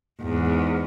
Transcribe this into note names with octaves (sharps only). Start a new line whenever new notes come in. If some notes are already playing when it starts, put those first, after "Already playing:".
E2 G#2